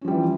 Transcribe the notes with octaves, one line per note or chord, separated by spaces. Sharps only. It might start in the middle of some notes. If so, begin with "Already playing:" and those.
E3 F3 G3 C#4